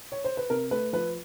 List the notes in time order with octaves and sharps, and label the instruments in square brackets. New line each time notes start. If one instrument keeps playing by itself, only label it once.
[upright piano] C#5
C5
B4
C3 A#4
A3 B4
F3 B4